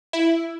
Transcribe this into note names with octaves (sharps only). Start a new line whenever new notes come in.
E4